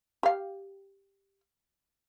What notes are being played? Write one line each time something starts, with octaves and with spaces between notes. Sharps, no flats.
G4 F5